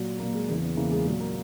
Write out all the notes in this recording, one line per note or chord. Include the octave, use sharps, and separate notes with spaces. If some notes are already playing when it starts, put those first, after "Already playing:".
Already playing: A#2 F#3
A#2 F#3 A#3
G#3
E2 C#3 E3 A#3
B3
E2 C#3 E3 A#3
G#3
A#2 F#3 G#3
A#3